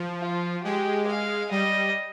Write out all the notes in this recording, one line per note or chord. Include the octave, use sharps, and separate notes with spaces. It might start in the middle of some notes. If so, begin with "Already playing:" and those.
Already playing: F3
F4
G#3 G4
F5
G3 D#5